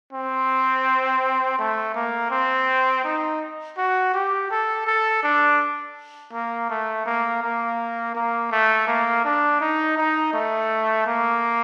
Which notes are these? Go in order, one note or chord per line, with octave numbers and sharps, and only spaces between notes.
C4
A3
A#3
C4
D#4
F#4
G4
A4
A4
D4
A#3
A3
A#3
A#3
A#3
A3
A#3
D4
D#4
D#4
A3
A#3